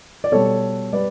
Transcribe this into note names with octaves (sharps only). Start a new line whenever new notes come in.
D5
B2 G3 A4 C#5
G3 B4 D5